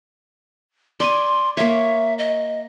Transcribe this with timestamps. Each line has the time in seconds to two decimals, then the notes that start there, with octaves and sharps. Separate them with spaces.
1.00 D5 G#5 C6
1.57 A#3 C#5 E5
2.18 D#5